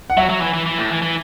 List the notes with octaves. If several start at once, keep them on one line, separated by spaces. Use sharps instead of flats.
F#5
F#3 E5
F#3
E3
E3
E3
A2
E3
E3